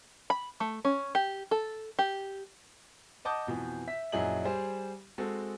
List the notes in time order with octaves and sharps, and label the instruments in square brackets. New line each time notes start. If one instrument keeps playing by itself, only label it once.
[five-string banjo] B5
A3
C#4
G4
A4
G4
[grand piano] D#5 F#5 A5 D6 D#6 G6
F2 B2 E3
E5 B6
A#1 F#2 E4 G#4 D#5 F#7
G3 G#4 C5
G#3 C4 F#4 A4